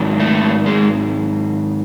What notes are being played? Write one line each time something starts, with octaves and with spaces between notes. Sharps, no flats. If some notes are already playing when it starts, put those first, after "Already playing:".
Already playing: G#2 D#3 F#3
A3
G#3